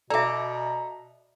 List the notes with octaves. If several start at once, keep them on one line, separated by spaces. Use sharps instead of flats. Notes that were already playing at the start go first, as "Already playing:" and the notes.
B2 A4 D5 E5 A#5 D6